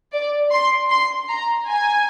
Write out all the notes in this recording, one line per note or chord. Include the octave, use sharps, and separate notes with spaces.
D5
C6
C6
A#5
G#5